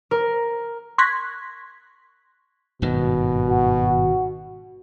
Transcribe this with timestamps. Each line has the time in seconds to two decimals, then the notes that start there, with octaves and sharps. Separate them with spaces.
0.11 A#4
0.98 C6 C#6 F#6 G#6 A#6 B6
2.82 G#1 G2 B2 D#3
3.49 F#4